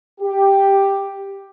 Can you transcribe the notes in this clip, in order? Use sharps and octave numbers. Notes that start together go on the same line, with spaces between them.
G4